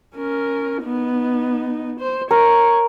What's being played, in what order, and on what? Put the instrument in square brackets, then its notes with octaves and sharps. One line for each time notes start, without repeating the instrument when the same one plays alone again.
[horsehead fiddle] C#4 A#4
B3 D#4
C5
[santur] A#4 [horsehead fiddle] C#5